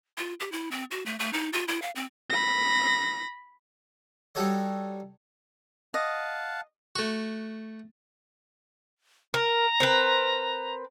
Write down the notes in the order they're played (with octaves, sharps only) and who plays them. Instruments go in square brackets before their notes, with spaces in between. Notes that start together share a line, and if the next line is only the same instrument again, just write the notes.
[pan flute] F4
G4
E4
C4
F#4
A3
A3
D#4
F4
E4
F5
C4
[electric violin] B5 A#6
[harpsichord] G3 D#4 F#4 A4 C#5 D#5
[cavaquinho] D#5 [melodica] F5 F#5 A5
[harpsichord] A3 F#4
[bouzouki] A#4 [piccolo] A#5
[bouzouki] C4 A#4 B4